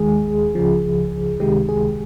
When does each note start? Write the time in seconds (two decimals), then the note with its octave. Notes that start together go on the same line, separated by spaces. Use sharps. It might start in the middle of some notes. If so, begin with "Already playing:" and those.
Already playing: D#2 D#3 G#3 G#4
0.55 C#2 C#3 F3
1.40 C#2 C3 D#3 G#3 G4
1.69 G#4